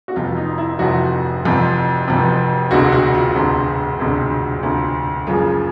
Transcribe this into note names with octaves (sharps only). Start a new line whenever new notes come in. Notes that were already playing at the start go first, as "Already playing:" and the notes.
F#4
F1 F2 C3 F4
D#4
E4
F1 F2 C3 F#4
F1 F2 C3
F1 F2 C3
E1 D2 C3 F#4
F#4
F4
E1 D2 C3
E1 D2 C3
E1 D2 C3 F4
F#1 F#2 C#3 F3 F4